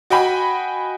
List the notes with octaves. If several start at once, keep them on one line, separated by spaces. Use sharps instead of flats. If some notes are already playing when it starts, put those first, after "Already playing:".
F#4 D#5 G5 G#5 B5